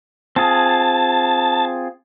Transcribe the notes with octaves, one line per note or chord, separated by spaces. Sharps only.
C4 F4 G#4 A5